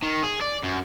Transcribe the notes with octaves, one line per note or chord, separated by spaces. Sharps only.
D#3
G#4
D5
F#2